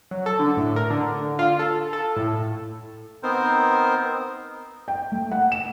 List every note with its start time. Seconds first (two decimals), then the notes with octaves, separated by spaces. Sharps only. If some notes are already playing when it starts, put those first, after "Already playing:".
0.11 F#3
0.26 A4
0.39 D3
0.57 A2
0.76 A#4
0.90 D3
1.39 F4
1.59 A4
1.93 A4
2.17 A2
3.23 B3 C4 D#4 A#4 C5
4.88 G5
5.12 A3
5.31 F#5
5.52 E7